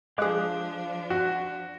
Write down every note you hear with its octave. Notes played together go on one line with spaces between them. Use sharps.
F3 G#3 D4 G#4 F5 D6 F#6
F#4